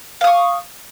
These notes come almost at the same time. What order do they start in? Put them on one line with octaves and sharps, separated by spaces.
F5 D#6 C#6